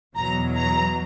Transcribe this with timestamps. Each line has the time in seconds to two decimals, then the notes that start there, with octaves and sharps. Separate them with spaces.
0.16 E2 B2 F#3 A#5
0.56 A#5